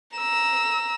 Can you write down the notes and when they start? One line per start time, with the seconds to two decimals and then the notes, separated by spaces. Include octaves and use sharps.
0.17 A#5 E6